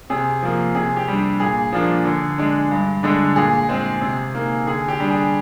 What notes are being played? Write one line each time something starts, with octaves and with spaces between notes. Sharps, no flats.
C3 G#4
F3 A#3
C3 G#4
G4
G3 D4
A#2 G#4
F3 A#3 D4
D3
G#3 D4
G2
D3 G#3 D4
A#2 G#4
G#3 C4
C3
D#3 A#3
D3 G#4
G4
G3 D4
G#4